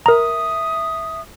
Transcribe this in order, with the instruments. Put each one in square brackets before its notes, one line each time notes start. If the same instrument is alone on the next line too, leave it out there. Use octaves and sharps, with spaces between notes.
[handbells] A#4 A#5 [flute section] E5 D#6